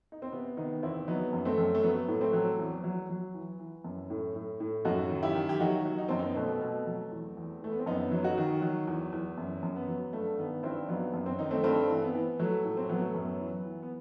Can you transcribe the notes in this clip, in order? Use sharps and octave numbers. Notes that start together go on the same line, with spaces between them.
D#4
C4
C3 B3
D#3 B3 D#4
E2 C4 E4
F#3 B3 D#4
F#2
A3 C4
F#2
A3
F#3 B3
A2
A3 C4
F#3
E2
F#3
F#3
E3
E3
F#2
A2
A2
A2
F#2 D#4 F#4
D#3
E4 G4
D#3
G4
F#3 D#4 F#4
F#3
D#4
F#2 C4
B3 D#4
B2 A3 C4
B2
F#3
E2
E2
E3 A3
B3
C4
F#2 B3 D#4
F#3
D#4 F#4
D#3
F#3
E2
E2
F#2
F#2
B3
F#3
G2 A3
D#3 B3
G2 C4 E4
F#3 B3 D#4
F#2
C4
D#3 D#4
A3 C4
G2 A3 C4
E3
B3
E3
F#3 A3
A2
C4
F#3 B3
A3
F#2 B3
E3
E3
B3